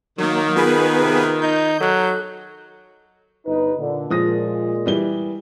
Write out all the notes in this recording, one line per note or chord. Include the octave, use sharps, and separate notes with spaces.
D#3 F#3 A#3
B3 F4 G#4 B4
C3
D#4 G6
F#3 A4 F#6
G1 D#4 B4
A#2 D3
A#2 F3 G#3 D#6 A#6
E3 G3 G7